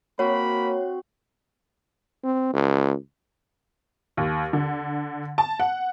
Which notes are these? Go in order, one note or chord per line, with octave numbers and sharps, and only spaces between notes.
A#3 C4 F#4 C#5 B5
C4
C#2
D#2
D3
A5
F#5